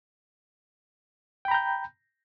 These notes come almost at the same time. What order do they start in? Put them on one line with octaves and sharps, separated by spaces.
G5 B5 A#5 G6